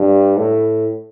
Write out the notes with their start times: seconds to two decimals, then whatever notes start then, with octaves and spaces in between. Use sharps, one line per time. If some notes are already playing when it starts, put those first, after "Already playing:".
Already playing: G2
0.38 A2